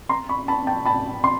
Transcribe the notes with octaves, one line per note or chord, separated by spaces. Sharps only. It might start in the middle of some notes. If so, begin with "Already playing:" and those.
A#5 C6
B5 C#6
A5 B5
G5 A5
A5 B5
C6